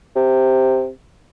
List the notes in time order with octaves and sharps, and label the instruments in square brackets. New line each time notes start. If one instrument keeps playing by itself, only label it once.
[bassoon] C3